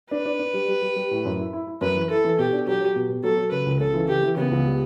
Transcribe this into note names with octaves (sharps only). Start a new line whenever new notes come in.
D4 B4
D4
D4
G3
G3
G3
G3
A2
F#2
E4
E4
E4
F#2 B4
E3
E4 A4
E3
B2 G4
D4
F#3 G4
F#3
B2
B2
F#3 A4
F#3
C#3 B4
C#2
C#3 A4
E3
E3 G4
E3
C#3 B3
C#2
G3